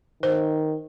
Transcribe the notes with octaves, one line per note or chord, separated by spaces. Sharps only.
D#3 C5